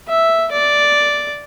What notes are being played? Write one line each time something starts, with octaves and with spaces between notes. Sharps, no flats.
E5
D5